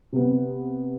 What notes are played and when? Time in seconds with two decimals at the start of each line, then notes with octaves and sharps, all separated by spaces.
0.13 C3 B3